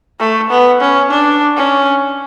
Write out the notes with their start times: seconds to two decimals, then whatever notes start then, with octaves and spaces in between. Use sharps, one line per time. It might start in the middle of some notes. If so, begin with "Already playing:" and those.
0.19 A3
0.50 B3
0.80 C#4
1.10 D4
1.56 C#4